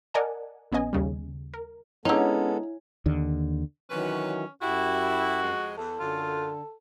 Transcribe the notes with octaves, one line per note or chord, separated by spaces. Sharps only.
A#4 D5 D#5 F#5 G#5 A5
A#1 B3 C#4 D#5 G#5
D#2 C#3 G3
A#4
D3 G#3 B3 C#4 D#4 E4 A4
D#2 D3
C3 D#3 E3 F#3 C#4 F#4 B4
F#2 E4 F#4 G4
F2 G#3
E2 A4
F#2 D3 F4